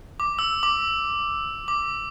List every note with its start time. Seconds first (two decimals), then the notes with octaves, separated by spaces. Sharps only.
0.20 D6
0.39 E6
0.63 D6
1.68 D6